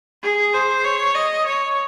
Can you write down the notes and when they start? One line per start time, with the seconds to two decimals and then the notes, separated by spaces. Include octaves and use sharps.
0.23 G#4
0.54 C5
0.85 C#5
1.15 D#5
1.46 C#5